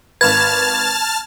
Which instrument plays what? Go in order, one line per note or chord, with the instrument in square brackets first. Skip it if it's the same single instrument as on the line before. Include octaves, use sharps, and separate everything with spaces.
[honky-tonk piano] G#1 B4 [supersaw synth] A5 F6 A6 [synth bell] G#6